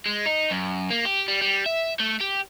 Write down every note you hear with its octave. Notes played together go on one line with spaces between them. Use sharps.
G#3
D#4
F#2
A#3
G4
G3
G3
E5
A3
G4